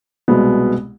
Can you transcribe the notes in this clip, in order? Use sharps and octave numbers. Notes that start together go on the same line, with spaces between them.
C2 B2 G#3 B3